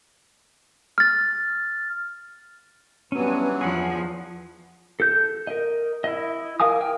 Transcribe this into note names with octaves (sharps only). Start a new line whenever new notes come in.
F6 A6
G2 E3 F#3 B3 C#4
E2 F3 G#4 F#5
A4 G6
A#4 D#5
E4 D#5
A#4 F5 G#5 D#6
A#4 G5 G#5